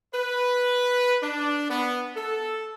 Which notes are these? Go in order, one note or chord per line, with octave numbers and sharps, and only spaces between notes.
B4
D4
B3
A4